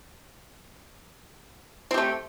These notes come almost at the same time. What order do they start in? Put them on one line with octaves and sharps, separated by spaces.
C4 G4 A3